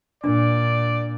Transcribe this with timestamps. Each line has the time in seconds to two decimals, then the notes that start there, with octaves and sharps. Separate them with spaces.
0.24 A#2 D4 D5